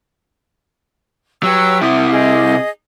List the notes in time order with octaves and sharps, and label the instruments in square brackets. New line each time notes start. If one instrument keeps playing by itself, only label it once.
[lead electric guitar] F#3 [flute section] G4 B4 E6
[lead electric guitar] C3 E4 [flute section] F#5 D#6
[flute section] G#4 D#5